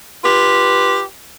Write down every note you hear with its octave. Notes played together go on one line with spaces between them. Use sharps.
F4 G4 B4